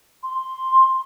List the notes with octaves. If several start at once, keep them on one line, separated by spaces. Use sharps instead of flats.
C6